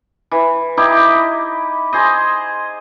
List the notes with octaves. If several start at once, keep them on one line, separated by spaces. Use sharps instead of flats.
E3
D#4 E4 G4
G#4 C5 D#5